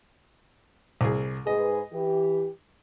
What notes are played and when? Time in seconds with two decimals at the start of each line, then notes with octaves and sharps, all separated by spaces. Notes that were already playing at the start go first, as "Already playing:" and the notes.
1.01 C2 G#4
1.47 G#2 G#4 B4 D#5
1.93 E3 G4